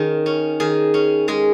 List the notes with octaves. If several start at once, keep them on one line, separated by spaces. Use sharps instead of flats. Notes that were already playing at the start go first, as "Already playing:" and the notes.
Already playing: D#3 C#4 G#4
C#4
D#3 G#4
C#4
G#3 G#4